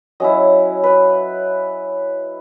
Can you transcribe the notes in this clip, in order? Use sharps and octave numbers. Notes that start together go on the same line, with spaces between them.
F#3 C#4 E4 D#5
B4